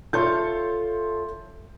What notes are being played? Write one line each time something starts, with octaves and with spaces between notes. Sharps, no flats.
F4 A4 C#5 E5 C6 G6